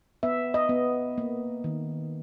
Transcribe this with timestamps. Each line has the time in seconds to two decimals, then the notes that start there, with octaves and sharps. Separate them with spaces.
0.23 B3 E5
0.54 D#5
0.69 B3
1.18 A#3
1.64 D#3